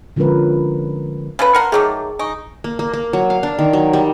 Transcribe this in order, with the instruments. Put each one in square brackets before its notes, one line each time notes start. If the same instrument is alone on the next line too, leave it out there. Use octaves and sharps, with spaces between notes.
[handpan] D3 F3 G#3 C#4 A#4 B4
[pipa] C#3 A4 B4
[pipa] A#4 F#5 C6 [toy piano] A5 A#5
[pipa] D#3 F#3 A3 [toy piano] G#4 A5 D6
[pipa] D#4 [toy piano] G#5 C#6
[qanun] A#3
A#3
A#3
F#3
F5
D4
D#3
F#3
G3